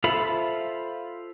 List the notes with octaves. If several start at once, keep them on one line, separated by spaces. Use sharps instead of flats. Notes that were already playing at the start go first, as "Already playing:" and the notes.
F4 A4 C5 E5 B5